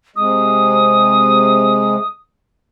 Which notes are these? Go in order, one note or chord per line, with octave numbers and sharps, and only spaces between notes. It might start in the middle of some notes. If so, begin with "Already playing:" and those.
C3 G#3 D#6